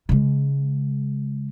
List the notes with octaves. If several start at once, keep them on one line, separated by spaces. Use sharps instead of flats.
C#3 G#3